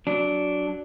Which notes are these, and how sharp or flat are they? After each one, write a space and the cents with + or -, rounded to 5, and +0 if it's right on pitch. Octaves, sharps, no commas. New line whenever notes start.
F#3 +0 D4 -10